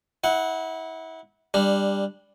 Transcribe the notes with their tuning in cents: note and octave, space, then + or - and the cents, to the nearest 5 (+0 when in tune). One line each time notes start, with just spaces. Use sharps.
E4 -30 F#5 +0
G3 +15 D4 +0